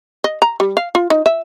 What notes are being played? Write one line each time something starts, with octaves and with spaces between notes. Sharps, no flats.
D#5
A#5
G3
F5
F4
D#4
E5